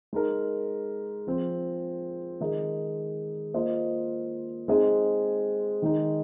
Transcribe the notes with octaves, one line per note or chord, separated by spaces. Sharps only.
G#3 D#4 A#4
F3 C4 G#4
D#3 G#3 D#4 A#4 D#5
A#3 F4 C5 D#5
G#3 C4 D#4 G#4 D#5
D#3 G#3 D#4